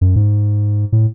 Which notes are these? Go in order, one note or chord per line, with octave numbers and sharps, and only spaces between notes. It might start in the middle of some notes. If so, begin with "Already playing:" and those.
F#2
G#2
A2